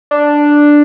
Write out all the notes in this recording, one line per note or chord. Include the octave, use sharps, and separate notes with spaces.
D4